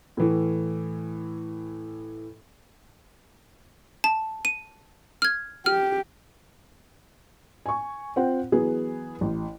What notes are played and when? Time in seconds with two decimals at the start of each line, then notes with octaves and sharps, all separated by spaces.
0.17 A2 E3
4.04 A5
4.45 D#7
5.22 F6 G#6
5.66 G4 F6
7.66 G#5 C#6
8.16 C4 F4 C5 F#5 G5
8.52 E3 F#3 B3 G#4
9.21 A1